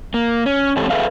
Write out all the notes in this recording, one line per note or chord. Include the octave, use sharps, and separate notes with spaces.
A#3
C#4
G#2 E3 C4 G4 A4 C#5
G#4 A4 B4 E5 F5